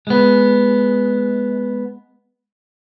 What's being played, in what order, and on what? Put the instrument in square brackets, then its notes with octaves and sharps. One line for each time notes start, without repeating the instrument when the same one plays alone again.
[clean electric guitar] G#3 B3